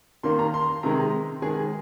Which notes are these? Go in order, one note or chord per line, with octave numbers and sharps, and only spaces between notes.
D#3 A#3 C6
A#5
C6
C3 D#3 G#3 A#5
D#3 G#3 G#4